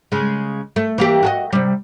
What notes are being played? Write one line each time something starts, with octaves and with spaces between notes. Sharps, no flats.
C#3 G#3
A3
E3 A#3 G4
F#4 A4 D#5
C3 G3